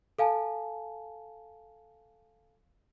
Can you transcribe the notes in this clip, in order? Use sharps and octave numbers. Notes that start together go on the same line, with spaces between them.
A4 F5 G#5 A5